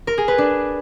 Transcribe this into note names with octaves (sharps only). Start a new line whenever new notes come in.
A#4
G#4
B4
D4